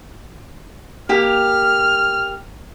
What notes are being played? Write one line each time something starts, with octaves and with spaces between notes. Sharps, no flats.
A#3 G4 F6